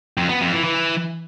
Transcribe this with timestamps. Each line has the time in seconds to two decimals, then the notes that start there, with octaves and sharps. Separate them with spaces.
0.17 F2
0.29 B3
0.41 F2
0.53 E3
0.64 E3